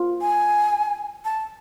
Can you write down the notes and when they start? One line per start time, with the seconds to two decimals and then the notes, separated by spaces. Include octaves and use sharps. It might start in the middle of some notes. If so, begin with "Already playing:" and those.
Already playing: F4
0.21 G#5
1.25 A5